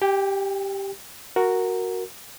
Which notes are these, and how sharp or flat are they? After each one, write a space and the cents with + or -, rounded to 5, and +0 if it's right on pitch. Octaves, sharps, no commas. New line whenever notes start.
G4 +0 G5 +45
F#4 +0 A#4 -5